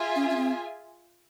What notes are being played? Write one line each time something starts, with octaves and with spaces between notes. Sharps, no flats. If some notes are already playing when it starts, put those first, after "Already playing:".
Already playing: F4 G#4 E5 G#5
C#4
C#4
C4